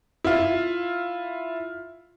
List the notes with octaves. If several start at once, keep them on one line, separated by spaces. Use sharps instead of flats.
E4 F4